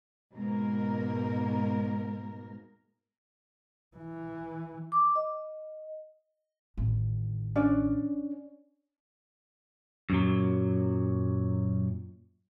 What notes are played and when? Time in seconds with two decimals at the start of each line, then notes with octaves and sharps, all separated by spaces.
0.34 G#2 B2 G#3 A#3 A#4
3.97 E3
4.92 D6
5.15 D#5
6.77 A1 D#3
7.56 C#4 D4 D5
10.10 F#2 A#2 F#3